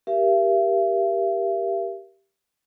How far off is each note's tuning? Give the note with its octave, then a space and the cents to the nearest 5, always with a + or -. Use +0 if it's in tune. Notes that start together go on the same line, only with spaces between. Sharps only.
G4 +0 A#4 +10 E5 +45